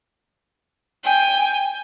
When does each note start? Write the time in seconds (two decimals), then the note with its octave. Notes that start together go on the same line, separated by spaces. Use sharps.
1.04 G5 G#5